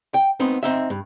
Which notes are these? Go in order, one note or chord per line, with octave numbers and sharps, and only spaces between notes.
G5
B3 C4 D#4
C4 D#4 E5
G2